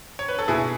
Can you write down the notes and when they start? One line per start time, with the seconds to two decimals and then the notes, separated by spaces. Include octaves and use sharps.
0.19 C#5
0.28 B4
0.39 A4
0.48 B2 E4 G#4